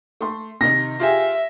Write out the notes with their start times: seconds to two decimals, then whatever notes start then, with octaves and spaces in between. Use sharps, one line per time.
0.21 A3 C6
0.61 C3 D#3 D#4 A#6
1.00 F4 G4 G#4 E5